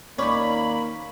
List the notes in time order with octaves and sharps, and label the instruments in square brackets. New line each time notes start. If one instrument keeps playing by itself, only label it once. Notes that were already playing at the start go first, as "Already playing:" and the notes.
[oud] D#2 D5 [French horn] A#3 [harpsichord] C#4 [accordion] B5